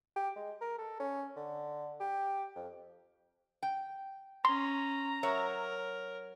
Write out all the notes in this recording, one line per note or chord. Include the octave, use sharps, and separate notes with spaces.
G4
G#3
A#4
A4
C#4
D3
G4
F2
G5
C#4 A#5 C6
F#3 A#4 C#5 E5